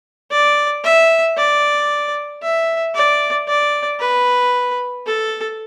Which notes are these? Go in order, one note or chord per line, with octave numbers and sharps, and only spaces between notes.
D5
E5
D5
E5
D5
D5
B4
A4